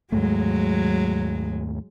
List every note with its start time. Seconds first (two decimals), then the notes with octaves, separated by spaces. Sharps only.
0.12 D#2 G#2 F#3 G#3 A3